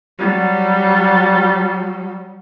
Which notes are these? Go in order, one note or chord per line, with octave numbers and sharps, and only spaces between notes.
F#3 G3